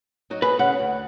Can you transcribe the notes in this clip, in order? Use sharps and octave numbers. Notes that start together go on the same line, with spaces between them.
F#3 D#4 F#4
G#4 B4
C#3 F#5
D2